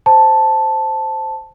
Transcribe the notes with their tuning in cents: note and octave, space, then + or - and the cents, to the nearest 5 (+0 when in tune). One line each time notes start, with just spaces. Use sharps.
C5 +0 A5 +0